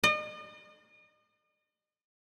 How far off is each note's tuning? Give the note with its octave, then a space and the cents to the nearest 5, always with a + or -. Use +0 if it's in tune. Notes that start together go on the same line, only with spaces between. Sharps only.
D#5 -40